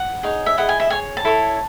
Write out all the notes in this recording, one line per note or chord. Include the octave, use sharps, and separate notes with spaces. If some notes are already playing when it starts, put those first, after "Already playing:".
Already playing: F#5
D#4 G#4 C#5
E5
E4 G#4 D#5 F#5
G#5
E5
G#4 C#5 G#5
A5
E4 A4 C#5